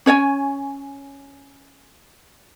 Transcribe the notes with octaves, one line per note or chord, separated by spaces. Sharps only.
C#4 C#5 D5 G#5